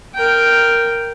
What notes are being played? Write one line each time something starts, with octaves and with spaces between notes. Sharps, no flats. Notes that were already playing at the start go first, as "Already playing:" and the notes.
A#4 G5